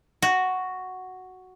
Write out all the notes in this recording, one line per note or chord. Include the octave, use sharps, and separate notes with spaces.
F#4